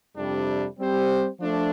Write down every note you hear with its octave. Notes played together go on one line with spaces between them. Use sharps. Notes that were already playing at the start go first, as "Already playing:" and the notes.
F2 C3 G3 D4
G3 C4 G4 C5
F3 A3 D4